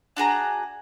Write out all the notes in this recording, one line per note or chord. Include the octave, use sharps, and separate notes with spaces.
D4 F#4 G#4 A#5